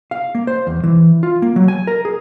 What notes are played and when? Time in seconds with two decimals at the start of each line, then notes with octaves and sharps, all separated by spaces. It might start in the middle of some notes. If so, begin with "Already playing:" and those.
0.11 F5
0.35 A#3
0.47 C5
0.67 E2
0.83 E3
1.23 F4
1.42 A#3
1.56 F#3
1.68 G#5
1.87 A#4
2.05 G#4